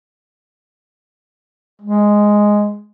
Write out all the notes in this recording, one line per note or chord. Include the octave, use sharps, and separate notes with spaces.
G#3